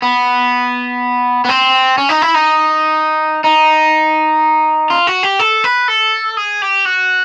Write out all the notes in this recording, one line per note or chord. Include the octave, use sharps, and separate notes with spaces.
B3
B3
C4
C#4
D#4
E4
D#4
D#4
F4
F#4
G4
A4
B4
A4
G#4
G4
F#4